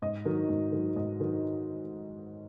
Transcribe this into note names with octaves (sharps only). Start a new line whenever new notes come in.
G#2 D#5
D#3 F#3
G#2
D#3 F#3
G#2 D#5
D#3 F#3